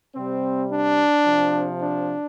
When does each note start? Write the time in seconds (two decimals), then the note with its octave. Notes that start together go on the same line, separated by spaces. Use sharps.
0.15 C3 G3 C4
0.70 D4
1.26 C3 F3
1.82 D4